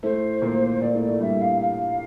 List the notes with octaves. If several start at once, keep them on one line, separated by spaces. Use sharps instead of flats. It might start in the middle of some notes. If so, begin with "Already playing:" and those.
A2 A3 C5
A#2 A#3
A#2 A#3 D5
A2 A3
D5
A2 A3
G2 G3 E5
F5
F5